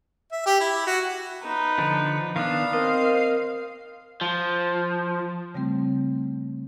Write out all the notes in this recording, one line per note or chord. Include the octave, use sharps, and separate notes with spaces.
E5
G4
E4
F#4
D#4 B4
D3 F3
D#3 B3 D4 F5
C4 A#4 D#5
F3
C#3 G3 A3 C4